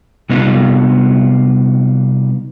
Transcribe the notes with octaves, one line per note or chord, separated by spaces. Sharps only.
C3 G3 B3 D#4 F4